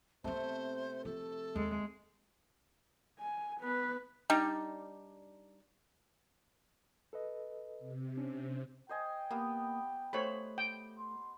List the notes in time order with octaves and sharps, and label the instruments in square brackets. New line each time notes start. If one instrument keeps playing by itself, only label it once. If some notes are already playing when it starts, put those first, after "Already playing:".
[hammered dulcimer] C3 A3 [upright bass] B3 C4 [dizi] C5
[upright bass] F3 [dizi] A4
[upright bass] D#2 [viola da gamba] G#3
[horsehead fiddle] G#5
B3 B4
[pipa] G3 D4 D#4
[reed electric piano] A4 B4 D#5
[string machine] C3
[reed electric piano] C#4 D4
[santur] C5 D#5 G#5 [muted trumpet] G5
[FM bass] A#3 [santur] B3 G4
[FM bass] A3 [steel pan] C5 C#5 B5
[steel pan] G5
[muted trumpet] C6